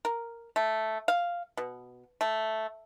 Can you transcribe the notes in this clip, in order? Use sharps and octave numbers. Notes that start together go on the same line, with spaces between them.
A#4
A3
F5
B2
A3